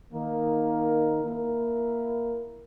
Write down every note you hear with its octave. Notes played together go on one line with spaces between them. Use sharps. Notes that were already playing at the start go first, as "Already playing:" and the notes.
D#3 A#3 D#4 A#4
A#3 E4 A#4